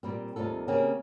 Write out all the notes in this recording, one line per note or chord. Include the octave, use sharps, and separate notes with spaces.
A#2 G3 C4
D#2 C3 G3 F4 A4
C#3 A#3 C4 C#4 G4 G#4